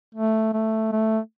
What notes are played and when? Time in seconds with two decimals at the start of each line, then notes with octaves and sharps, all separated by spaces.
0.15 A3
0.53 A3
0.92 A3